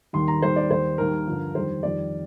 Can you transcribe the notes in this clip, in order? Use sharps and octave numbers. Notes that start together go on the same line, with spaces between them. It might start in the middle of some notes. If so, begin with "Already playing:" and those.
D#2 D#3 G3 C6
A#5
D#2 D#3 G3 C5
D5
D#2 D#3 G3 C5
D#2 D#3 G3 A#4
G2 D3 F3
F2 D#3 G3 C5
F2 D#3 G3 D5